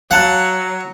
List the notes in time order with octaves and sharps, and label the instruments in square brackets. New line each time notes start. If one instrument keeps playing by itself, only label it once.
[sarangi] F#3 [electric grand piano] F5 A5 F#6 [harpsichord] F#5